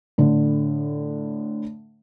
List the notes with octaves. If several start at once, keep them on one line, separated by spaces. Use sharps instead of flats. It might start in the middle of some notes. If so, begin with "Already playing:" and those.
A2 D3